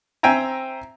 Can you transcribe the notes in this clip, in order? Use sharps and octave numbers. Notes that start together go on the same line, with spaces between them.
C4 E5 G5 G#5 A#5